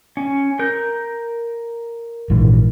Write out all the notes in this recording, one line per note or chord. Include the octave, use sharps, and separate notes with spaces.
C#4
A#4 G6
A#1 G#2 E3